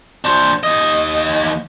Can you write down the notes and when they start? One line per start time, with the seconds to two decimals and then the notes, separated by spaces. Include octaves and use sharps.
0.24 D4 C5
0.63 D#2 D#5